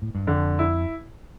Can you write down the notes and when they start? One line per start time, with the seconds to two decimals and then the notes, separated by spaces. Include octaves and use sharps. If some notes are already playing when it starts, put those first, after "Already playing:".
0.02 A2
0.15 G2
0.27 F2 D3
0.59 E4